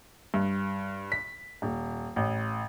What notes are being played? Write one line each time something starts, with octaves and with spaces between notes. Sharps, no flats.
G2
B6
D#1
A1